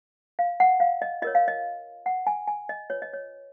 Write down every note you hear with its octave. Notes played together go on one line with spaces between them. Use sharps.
F5
F#5
F5
D#5
F4 A#4 C#5 D#5
F5
D#5
F#5
G#5
G#5
D#5
F4 B4 C#5
D#5
C#5